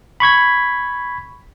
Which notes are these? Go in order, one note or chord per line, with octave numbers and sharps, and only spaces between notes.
B5 C#6 G#6 B6